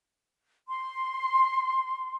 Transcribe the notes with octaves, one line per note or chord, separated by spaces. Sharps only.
C6